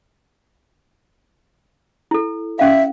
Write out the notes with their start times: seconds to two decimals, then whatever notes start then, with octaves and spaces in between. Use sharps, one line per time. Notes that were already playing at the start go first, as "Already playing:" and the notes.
2.11 E4 A4
2.59 C#4 E5 F5